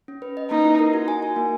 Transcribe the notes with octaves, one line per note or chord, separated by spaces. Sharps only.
C#4
B4
D#5
A#3 D#4
E4
A#4
F#4
G#5
F#4
A#3